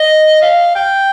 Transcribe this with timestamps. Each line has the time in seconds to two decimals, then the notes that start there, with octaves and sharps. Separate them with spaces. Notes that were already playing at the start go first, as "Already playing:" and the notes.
Already playing: D#5
0.42 F5
0.75 G5